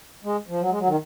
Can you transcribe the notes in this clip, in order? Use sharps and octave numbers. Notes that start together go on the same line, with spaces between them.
G#3
F3
F#3
G#3
F#3
D#3